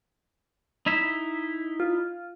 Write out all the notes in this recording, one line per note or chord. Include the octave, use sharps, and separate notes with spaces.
D#4 E4 E5
F4